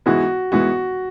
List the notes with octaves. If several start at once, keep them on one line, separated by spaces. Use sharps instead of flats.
G#2 E3 G#3 B3 F#4
G#2 E3 G#3 B3 F#4